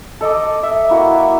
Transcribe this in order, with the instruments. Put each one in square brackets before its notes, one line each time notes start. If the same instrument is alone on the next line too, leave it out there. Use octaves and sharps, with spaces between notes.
[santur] A4 D#5 A5 D6
E5
A#3 E4 F#4